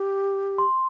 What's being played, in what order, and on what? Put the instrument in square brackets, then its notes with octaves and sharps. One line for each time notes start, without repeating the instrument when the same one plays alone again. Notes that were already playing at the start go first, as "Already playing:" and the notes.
Already playing: [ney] G4
[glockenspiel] C6